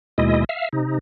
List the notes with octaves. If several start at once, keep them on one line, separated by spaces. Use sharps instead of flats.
D#2 B2 G#3 E4 D#5
E5 F5
C3 D#4